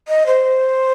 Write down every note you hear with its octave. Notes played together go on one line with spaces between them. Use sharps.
D#5
C5